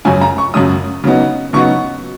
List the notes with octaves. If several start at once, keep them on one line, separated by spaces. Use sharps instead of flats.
F#2 C#3 F#3 C#4 G#5
A#5
C#6
F#2 C#3 F#3 C#4 D#6
C#3 F#3 B3 D#4
C#3 F#3 B3 D#4 C#6